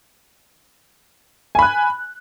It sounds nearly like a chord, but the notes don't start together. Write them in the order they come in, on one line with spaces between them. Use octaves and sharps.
G#5 B5 F#6